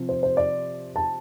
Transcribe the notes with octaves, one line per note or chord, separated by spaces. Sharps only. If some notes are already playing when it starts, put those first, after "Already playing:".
Already playing: C3 F3 C4
C5
C5
D5
A5